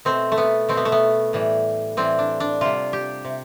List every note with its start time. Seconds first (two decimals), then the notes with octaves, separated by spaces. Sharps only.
0.05 B2 A3 C4
0.32 A3
0.38 B3
0.69 B2 A3 C4
0.77 B3
0.85 A3
0.92 B3
1.33 A2 E3 G3
1.97 A2 E3 G3 C4
2.19 D4
2.40 D4
2.61 C3 G3 F4
2.93 G4
3.25 C3